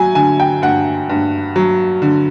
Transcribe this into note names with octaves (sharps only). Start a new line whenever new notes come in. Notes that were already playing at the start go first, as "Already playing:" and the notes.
Already playing: F#3 G#5
D3 G#5
G5
G2 F#5
G2
F#3
D3